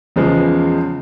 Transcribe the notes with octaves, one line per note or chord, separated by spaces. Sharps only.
E2 C#3 F3 G#3 B3